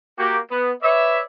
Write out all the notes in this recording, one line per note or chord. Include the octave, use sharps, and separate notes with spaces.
A#3 F#4 G4
B3
B4 C#5 D5 E5